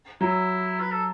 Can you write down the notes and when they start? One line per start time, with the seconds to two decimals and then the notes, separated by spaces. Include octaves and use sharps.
0.21 F#3 E4
0.80 B4
0.91 A4